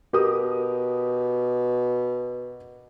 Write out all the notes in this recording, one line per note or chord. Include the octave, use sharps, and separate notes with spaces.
B2 G4 A#4 D#6